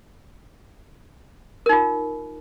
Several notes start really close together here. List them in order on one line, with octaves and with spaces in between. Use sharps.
A#4 D#4 F4